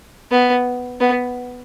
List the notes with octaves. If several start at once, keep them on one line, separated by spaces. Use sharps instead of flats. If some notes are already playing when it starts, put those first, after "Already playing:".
B3
B3